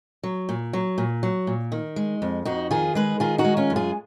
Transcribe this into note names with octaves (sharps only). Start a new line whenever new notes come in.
F#3
A#2
F#3
A#2
F#3
A#2
D#3
G#3
F2
F2 D#4 F#4
D#3 F4 G#4
G#3 G#4 B4
D#3 F4 G#4
D#4 F#4
G#3
C#4 F4
F#2
F4 G#4